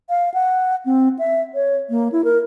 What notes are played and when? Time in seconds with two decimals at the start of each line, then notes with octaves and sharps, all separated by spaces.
0.10 F5
0.34 F#5
0.86 C4
1.19 E5
1.55 C#5
1.90 A#3
2.12 E4
2.24 A#4